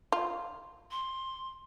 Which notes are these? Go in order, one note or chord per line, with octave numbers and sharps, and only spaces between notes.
F4
C6